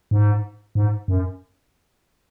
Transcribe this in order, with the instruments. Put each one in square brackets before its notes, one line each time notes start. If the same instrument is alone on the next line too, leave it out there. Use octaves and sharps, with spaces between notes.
[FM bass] G#2
G#2
F#2